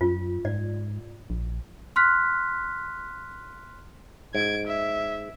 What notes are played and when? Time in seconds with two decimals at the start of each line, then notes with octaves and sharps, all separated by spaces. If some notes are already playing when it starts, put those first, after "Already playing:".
0.01 F#2 F4
0.45 G#2 D5
1.30 A#1
1.96 C6 F6 F#6 B6
4.35 G#2 G#6 D7
4.67 E5